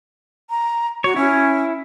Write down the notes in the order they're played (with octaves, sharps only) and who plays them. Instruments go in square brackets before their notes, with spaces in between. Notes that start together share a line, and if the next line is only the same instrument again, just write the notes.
[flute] A#5
[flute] F#4 [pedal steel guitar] C#5
[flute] C#4 [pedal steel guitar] E4